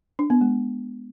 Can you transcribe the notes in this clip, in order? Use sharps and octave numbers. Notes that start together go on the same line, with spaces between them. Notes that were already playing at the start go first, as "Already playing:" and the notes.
D4
B3
G#3